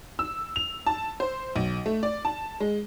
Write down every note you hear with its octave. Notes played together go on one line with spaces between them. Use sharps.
E6
F7
A5
C5
B1
A3
D5
A5
G#3